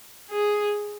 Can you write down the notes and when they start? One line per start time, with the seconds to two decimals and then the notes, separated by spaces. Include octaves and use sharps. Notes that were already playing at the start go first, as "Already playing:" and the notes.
0.31 G#4